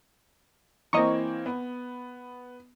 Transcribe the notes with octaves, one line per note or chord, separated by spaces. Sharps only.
E3 A#3 C4 D#5 A#5 C#6
B3